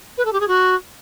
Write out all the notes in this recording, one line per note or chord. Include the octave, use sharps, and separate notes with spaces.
B4
A4
G4
G#4
F#4